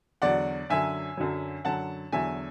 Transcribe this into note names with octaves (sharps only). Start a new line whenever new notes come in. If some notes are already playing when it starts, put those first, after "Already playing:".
E2 D3 F#3 D5 F#5
F#2 D3 F#3 E5 G#5
F#2 D3 F#3
F#2 D3 F#3 F#5 A5
E2 D3 F#3 E5 G#5